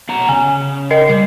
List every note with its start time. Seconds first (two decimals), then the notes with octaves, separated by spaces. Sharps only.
0.09 B3 F#5 A#5
0.29 C#3 G#5
0.91 A#4 D#5 C7
1.09 G3